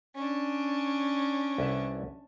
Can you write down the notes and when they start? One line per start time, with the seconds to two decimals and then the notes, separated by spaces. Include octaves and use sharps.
0.15 C#4 D4
1.58 C2 B4 E5